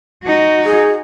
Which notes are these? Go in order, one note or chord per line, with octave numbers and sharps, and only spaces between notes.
D#4 F#4
G#4